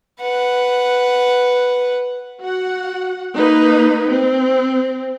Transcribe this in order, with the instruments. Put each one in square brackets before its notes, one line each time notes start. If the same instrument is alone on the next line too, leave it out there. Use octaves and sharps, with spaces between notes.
[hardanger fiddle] B4 F#5
[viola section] F#4 F#5
A#3 D#4 B4
C4